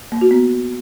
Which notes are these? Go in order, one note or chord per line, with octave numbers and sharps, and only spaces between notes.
A#3
F#4
B3